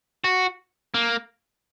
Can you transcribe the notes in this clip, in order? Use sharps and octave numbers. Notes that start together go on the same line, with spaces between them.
F#4
A#3